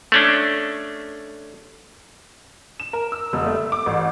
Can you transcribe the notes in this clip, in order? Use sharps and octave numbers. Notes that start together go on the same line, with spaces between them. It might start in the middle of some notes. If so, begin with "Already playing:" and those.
A3 C#4 D4
E7
A#4
E6
F1
A3
D6
A1